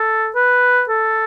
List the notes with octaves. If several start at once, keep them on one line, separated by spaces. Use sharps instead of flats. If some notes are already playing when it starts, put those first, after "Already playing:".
Already playing: A4
B4
A4